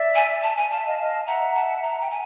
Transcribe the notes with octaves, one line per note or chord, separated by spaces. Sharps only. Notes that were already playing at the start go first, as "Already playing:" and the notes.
Already playing: D5 E5
G#5
A5
G#5
F5 A5
E5
D#5 F5
D#5 F5
E5 F#5 A#5
A5
A#5
G5
G#5